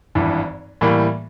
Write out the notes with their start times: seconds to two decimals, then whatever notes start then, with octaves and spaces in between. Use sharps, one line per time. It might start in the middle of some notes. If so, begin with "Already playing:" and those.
0.15 G#1 G2 E3
0.81 A2 E3 G3 A#3